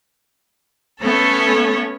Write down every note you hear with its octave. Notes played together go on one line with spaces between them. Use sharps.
A3 B3 C#4 A4 C#5